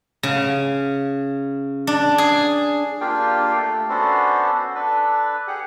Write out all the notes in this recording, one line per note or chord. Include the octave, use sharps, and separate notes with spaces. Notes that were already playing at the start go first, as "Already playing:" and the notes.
C#3
D4
G#4
A#3 D4 F4 G4 F5 G5
A3 A4
B3 C#4 D4 F#4 A4 C5
D4 A4 B4
G4 G#4 F#5